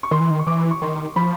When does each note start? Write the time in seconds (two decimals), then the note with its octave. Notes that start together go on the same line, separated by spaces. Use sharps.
0.03 C#6
0.11 D#3 C6
0.20 E3
0.30 D#3
0.39 C#6
0.47 E3 D6
0.71 C#6
0.82 D#3 C6
1.16 F3 B5